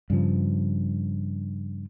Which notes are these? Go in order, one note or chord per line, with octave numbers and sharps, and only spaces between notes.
G2 C#3 F3